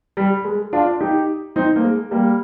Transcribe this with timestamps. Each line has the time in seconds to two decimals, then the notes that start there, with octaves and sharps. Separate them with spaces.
0.17 G3
0.45 G#3
0.73 D4 F4
1.00 D#4 G4
1.56 C4 D#4
1.76 A#3
1.84 G#3
2.11 G3 A#3